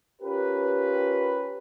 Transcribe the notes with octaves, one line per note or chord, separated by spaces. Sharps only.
C#4 F4 G4 A#4 B4